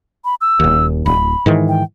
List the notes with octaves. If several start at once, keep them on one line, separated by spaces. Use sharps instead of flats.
B5
E6
D#1 D#2
D1 B5
G#2 D#3 E3
G5